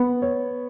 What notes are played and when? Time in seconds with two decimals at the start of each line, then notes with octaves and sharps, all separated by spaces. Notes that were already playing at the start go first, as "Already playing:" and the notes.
Already playing: B3
0.22 C#5